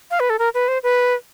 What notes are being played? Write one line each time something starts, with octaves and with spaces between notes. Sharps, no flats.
F5
B4
A4
A#4
B4
C5
B4